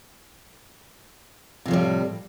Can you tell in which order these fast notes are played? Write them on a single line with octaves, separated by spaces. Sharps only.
C3 F3 A2 G3